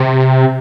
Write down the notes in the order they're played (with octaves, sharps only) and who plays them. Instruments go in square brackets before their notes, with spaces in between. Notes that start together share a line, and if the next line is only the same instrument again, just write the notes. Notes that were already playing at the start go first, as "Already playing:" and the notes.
Already playing: [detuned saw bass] C3